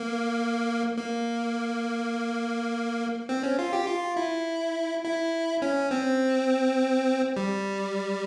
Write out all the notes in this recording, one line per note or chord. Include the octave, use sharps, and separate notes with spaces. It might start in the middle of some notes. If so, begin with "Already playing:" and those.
Already playing: A#3
A#3
C4
C#4
F4
G4
F4
E4
E4
C#4
C4
G3